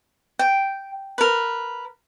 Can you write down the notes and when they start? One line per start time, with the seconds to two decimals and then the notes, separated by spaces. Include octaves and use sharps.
0.39 G5
1.18 A#4 B4